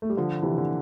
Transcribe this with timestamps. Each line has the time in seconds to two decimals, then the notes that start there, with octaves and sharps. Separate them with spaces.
0.02 A3
0.10 G3
0.17 D3 F3
0.42 C3 E3
0.58 D3